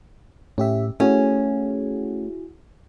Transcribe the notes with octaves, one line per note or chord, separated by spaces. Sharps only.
A2 C#4 G4 E5
A3 C#4 E4 F#4 G#4